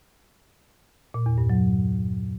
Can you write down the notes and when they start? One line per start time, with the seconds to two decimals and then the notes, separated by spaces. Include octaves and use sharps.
1.14 A#2
1.26 E2
1.38 G2
1.50 F#3